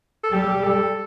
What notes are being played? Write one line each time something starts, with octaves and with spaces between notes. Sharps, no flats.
A4
G3 G4
A4